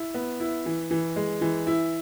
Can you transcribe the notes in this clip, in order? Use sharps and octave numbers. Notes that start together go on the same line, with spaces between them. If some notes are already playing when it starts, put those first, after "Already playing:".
Already playing: E4
B3
E4
E3
E3
G#3
E3
E4